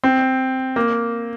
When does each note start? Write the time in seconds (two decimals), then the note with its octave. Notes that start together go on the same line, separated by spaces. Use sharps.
0.04 C4
0.76 A#3